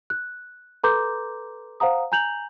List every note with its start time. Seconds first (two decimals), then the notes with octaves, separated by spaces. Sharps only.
0.10 F#6
0.84 A4 B4 A#5 C6 D6 G6
1.80 C5 F5 F#5 A#5 D#6
2.12 G#5 A#5 G6 F7 F#7